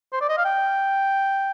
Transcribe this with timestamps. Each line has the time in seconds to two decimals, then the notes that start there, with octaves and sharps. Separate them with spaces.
0.13 C5
0.21 D5
0.29 D#5
0.37 F5
0.45 G5